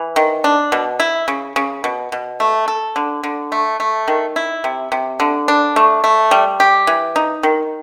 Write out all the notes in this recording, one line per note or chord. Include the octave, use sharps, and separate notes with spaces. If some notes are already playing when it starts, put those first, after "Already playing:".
Already playing: E3
D#3
D4
B2
E4
C#3
C#3
B2
B2
A3
A4
D3
D3
A3
A3
D#3
E4
C3
C3
D3
D4
A3
A3
G3
G4
E3
D#4
D#3